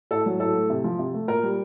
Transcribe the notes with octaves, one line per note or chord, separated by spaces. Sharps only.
A2 A4
F#3
A2 A4
A3
C3
F3
C3
A3
A#2 A#4
G3